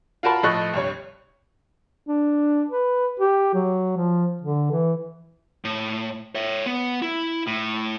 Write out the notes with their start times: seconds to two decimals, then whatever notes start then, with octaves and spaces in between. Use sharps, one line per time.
0.23 F4 F#4 A#4 A5 B5
0.43 A2 F3 A3 D#5 C#6 F#6
0.73 C2 G2 C#5
2.07 D4
2.69 B4
3.20 G4
3.55 F#3
3.97 F3
4.42 D3
4.71 E3
5.65 A2
6.35 C#5 E5
6.66 B3
7.02 E4
7.47 A2